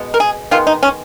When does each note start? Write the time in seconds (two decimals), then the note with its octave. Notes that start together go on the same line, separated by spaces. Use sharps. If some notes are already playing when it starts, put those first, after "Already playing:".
Already playing: B2 G#3 B3
0.14 A#4
0.20 G#4
0.51 D#3 G#3 B3 F4
0.67 D#4
0.83 C#4